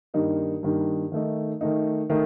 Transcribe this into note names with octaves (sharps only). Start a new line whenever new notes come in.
G2 D#3 A#3 D#4
G2 D#3 A#3 D#4
D#3 A3 D#4
D#3 A3 D#4
D#3 A3 D#4